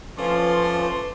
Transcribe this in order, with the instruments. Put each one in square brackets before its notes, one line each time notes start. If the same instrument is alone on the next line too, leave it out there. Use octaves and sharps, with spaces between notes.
[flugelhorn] F3 [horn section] A3 D5 C6 [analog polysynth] C#4 F4 [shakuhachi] B4